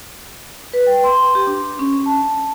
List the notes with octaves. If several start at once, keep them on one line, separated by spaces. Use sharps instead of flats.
B4
G5
C6
G4
D4
C#4
A5